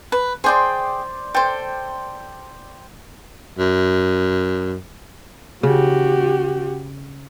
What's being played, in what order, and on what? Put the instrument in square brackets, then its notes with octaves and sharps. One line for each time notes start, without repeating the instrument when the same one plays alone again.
[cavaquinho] B4
[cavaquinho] G#4 G5 C6 [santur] C5 D5
[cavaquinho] A4 C5 [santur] G5
[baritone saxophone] F#2
[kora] C#3 [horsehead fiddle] F#4 G4